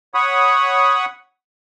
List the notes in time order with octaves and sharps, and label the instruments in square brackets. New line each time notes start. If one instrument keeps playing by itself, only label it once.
[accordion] C#5 F#5 B5 C#6 D#6